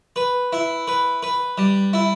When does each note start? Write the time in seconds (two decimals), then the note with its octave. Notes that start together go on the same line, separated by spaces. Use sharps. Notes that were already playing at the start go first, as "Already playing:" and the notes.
0.16 B4
0.53 E4
0.88 B4
1.23 B4
1.58 G3
1.93 E4